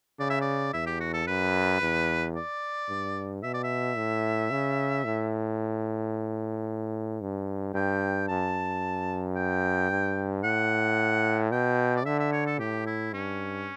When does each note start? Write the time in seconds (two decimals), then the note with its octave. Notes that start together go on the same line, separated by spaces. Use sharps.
0.19 C#3 D5
0.30 E5
0.41 D5
0.74 E2 E5
0.87 G4
1.00 F#4
1.14 A4
1.28 F#2 B4
1.82 E2
2.36 D5
2.89 G2
3.43 B2 E5
3.54 D5
3.64 E5
3.97 A2
4.51 C#3
5.05 A2
7.21 G2
7.74 G2 G5
8.28 F#2 A5
9.36 G5
9.90 G2
10.44 A2 F#5
11.52 B2 G5
11.97 D5
12.06 D3 E5
12.20 E5
12.33 C#5
12.47 A4
12.59 A2 G4
12.87 E4
13.14 G2 C#4